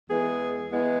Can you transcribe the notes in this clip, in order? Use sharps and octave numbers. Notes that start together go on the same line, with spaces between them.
E2 E3 G#3 B3 G#4
E2 E3 G#3 B3